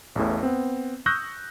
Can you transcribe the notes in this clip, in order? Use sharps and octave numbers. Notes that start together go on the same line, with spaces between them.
A1 E2 A2
B3 C4
C#6 D#6 E6 F#6 G6 A#6